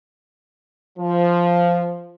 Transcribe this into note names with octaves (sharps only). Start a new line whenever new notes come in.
F3